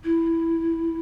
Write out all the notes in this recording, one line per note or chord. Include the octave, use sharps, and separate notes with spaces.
E4